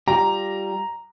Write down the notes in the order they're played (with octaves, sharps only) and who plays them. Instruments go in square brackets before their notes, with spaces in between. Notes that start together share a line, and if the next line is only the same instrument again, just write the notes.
[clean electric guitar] G3 F4 G4 [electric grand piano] A#5